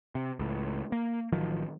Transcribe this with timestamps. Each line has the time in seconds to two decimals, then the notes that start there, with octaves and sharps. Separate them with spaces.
0.15 C3
0.39 C#2 A2
0.92 A#3
1.32 A1 D#3 F3 F#3